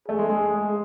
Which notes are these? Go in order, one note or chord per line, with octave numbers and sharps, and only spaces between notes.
A3 G#4
G#3
G#3